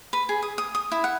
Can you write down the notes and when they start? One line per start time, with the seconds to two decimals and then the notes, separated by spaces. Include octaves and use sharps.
0.13 B4
0.29 G#4
0.43 D#6
0.58 D#6
0.75 D#6
0.92 E4
1.04 F#5